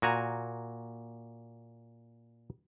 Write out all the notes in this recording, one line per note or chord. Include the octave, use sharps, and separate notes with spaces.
A#2 F#4 G#5 A#5